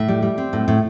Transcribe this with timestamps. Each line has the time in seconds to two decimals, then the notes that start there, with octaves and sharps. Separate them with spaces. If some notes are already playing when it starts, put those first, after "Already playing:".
Already playing: A2 E5
0.08 G3
0.22 G3
0.38 C4
0.53 A2
0.68 A2